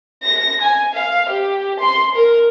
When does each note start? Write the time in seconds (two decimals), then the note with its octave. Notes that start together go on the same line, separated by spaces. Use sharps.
0.23 A#6
0.61 G#5
0.94 F5
1.29 G4
1.80 C6
2.15 A#4